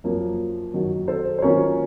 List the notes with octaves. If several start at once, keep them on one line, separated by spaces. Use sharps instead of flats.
F#2 F3 A#3 F4
F#2 D#3 F#3
A4 C5
C5
D#3 F#3 A#3 C#4 F4 A#4 C#5